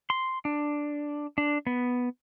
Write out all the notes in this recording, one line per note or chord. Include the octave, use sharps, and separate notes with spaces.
C6
D4
D4
B3